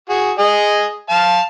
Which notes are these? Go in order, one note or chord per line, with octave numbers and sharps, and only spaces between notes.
F#4 G#4
G#4 D#5
F5 A5